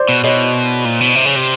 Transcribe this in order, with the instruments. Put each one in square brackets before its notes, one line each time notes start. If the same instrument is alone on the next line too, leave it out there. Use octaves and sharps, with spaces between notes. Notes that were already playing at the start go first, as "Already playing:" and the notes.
Already playing: [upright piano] C5 D5
[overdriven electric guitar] B2
[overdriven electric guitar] B2 [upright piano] C#5 D#5
[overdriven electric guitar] A#2
B2
C3
C#3
C3